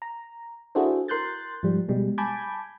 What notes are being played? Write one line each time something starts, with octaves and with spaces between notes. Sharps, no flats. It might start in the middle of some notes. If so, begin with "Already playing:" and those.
A#5
D4 E4 F#4 G#4 A4 C5
A#4 C6 F#6 G6 A6
G#2 F3 G3
B2 G3 G#3
G#5 A5 B5 D6 G6 G#6